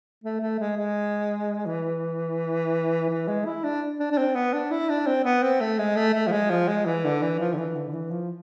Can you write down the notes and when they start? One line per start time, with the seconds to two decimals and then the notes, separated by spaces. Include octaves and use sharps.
0.24 A3
0.41 A3
0.59 G#3
0.77 G#3
1.66 E3
3.10 E3
3.28 G#3
3.46 E4
3.64 D4
4.00 D4
4.12 D4
4.18 C4
4.35 B3
4.53 D4
4.71 E4
4.89 D4
5.07 C4
5.24 B3
5.43 C4
5.61 A3
5.79 G#3
5.96 A3
6.14 A3
6.27 F3
6.32 G#3
6.50 F3
6.68 G#3
6.86 E3
7.05 D3
7.22 E3
7.39 F3
7.53 D3
7.58 E3
7.75 D3
7.88 D3
7.93 E3
8.11 F3